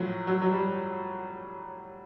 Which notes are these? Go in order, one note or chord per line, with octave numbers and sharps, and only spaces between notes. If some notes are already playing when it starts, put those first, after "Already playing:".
Already playing: A2 F3 F#3
F#3
F#3
G3